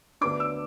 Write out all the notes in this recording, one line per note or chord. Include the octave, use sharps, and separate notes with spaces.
D2 D3 B3 D4 D6
E6